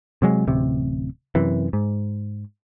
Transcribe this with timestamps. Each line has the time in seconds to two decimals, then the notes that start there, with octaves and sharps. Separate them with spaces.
0.22 C3 F#3 G#3
0.47 D1 A1 C3
1.35 F#2 C3 E3
1.73 G#2